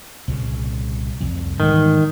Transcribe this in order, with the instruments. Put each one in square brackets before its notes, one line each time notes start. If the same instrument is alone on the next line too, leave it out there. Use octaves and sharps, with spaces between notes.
[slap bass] C2 A#2 C#3
C2 F2
[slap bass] G#2 E3 G3 [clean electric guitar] D#3